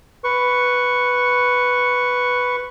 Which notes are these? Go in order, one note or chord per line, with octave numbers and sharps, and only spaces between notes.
B4 C#6